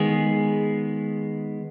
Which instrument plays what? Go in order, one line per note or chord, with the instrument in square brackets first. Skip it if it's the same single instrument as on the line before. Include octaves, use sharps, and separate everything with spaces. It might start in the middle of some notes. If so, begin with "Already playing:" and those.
Already playing: [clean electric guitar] D#3 G#3 B3 G#4